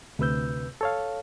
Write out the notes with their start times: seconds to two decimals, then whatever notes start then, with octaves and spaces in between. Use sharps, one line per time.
0.19 D2 C3 B4 E6 G6
0.81 A4 C#5 F5